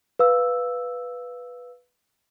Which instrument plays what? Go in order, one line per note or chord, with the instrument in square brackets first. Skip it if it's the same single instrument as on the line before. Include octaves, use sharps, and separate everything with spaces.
[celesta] B4 F5 E6